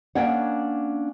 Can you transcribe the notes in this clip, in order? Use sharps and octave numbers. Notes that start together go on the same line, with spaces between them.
A#3 C#4 D4 C#5 F#5